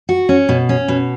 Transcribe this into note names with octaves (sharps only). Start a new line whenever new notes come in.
F#4
C#4
B2
C#4
B2